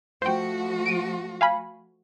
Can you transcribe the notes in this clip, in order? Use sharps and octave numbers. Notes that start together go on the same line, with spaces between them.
F3 A3 F#4 C5 G5
D7 D#7
F5 G#5 B5